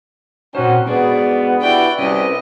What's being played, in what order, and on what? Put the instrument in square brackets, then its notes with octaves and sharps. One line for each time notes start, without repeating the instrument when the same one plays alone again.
[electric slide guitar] A#2 C5 [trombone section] C4 C#4 F#4 [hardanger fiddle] D#4
[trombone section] G#2 B3 [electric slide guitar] D4 F#4 G#4 [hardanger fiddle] D5
[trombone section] E4 F#4 G4 [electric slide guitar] B4 [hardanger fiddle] D5 G5
[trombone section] C2 [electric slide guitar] C#4 B4 [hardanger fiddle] D#5